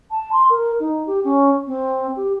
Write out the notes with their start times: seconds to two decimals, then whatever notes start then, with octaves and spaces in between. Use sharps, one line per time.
0.11 A5
0.33 C6
0.50 A#4
0.80 D#4
1.07 G4
1.24 C#4
1.67 C4
2.16 G4